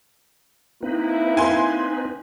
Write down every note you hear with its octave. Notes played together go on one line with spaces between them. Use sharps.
A#3 C4 D#4 E4 B4
G#5 C6